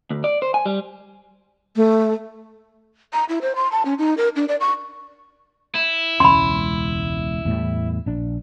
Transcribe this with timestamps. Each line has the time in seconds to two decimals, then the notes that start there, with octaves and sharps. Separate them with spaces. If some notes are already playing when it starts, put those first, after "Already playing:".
0.10 D2
0.24 D5
0.42 C5
0.54 G#5
0.66 G3
1.76 A3
3.13 A#5
3.29 E4
3.42 C5
3.56 C6
3.72 A5
3.85 C#4
3.99 D#4
4.18 A#4
4.36 D4
4.48 D5
4.61 C#6
5.75 E4
6.20 E1 C#2 C#4 B5 C6
7.45 E2 A2 G3
8.06 A#1 D4